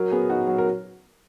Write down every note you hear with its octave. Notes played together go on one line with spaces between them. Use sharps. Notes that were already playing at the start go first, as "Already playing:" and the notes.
Already playing: F#3 A#4
B3 G#4
D#4 F#4
F#3
A#4